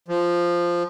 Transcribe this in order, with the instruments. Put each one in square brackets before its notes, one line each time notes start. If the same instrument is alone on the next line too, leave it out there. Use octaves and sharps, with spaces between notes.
[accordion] F3